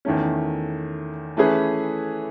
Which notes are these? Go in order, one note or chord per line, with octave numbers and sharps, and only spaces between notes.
E2 D#3 A3 C#4
E3 A3 C#4 G#4 B4